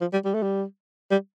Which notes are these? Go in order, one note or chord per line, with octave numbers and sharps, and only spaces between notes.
F3
G3
G3
A3
G3
G3